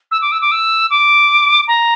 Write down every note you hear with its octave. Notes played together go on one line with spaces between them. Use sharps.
E6
D6
E6
D6
E6
D6
A#5